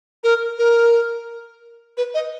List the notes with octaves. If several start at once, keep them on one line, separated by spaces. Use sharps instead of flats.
A#4
A#4
B4
D#5